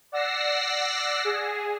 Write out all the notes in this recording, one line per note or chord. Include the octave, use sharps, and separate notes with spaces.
D5 F#5 E6 A#6 C7
G#4